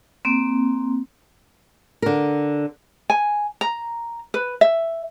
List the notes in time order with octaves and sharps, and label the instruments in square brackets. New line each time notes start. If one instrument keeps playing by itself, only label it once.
[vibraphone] A#3 C4
[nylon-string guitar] D3 A#4
[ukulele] G#5
A#5
B4
E5